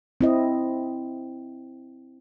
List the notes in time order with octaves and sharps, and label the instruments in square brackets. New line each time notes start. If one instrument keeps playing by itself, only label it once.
[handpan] C4 E4 D#5